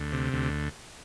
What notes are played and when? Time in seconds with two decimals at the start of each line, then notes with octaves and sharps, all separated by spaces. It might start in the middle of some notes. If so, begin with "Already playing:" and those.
Already playing: D2
0.13 C3
0.33 D2